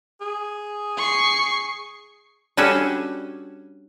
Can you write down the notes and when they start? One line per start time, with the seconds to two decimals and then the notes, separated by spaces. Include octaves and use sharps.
0.21 G#4
0.97 C#6 C7
2.57 G3 C#4 D4 F#4 A4